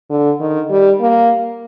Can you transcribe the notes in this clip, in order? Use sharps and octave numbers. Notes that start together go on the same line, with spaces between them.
D3
D#3
G3
A#3